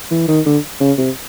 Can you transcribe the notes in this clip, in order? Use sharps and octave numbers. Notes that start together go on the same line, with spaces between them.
E3
D#3
D3
C#3
C3